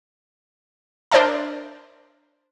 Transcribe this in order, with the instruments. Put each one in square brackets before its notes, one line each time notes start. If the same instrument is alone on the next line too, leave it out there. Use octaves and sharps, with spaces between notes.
[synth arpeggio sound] D4 A#4 C5 D5 E5 A5